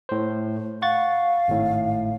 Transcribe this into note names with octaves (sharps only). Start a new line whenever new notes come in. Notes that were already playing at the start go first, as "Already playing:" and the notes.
A2 C5
F5 F#5 C#6 A6
G#1 A2